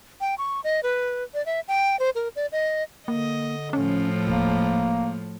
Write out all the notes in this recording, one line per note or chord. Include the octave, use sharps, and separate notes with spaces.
G5
C#6
D#5
B4
D5
E5
G5
C5
A#4
D5
D#5
D3 A#3 D#5
A2 F3 C#4
D#1 A#3